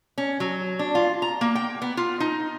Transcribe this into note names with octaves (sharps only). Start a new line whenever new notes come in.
C#4
F#3
D4
F4
A#5
A#3
G5
B3
F4
D#4